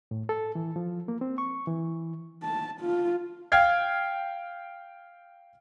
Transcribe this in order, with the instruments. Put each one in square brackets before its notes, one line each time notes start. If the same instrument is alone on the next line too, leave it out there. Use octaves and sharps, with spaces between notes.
[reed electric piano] A2
A4
E3
F3
A#3
C4
C#6
E3
[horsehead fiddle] A5
F4
[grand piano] F5 G5 F6 G#6 C7